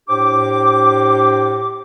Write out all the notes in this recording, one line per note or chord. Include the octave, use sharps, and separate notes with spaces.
A2 D4 G4 C5 G5 D6